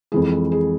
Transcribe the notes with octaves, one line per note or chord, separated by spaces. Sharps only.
F2 E3 G#3 G#4
G#4